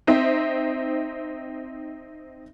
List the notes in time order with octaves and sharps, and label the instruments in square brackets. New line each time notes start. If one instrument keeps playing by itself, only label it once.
[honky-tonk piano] C4 D#4 C5 E5